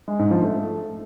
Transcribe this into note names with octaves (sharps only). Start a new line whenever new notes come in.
G#3
G#2
F3
A3